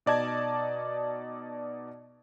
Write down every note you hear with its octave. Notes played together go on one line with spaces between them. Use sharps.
B2 D#4 D5 D#5 A5 G#6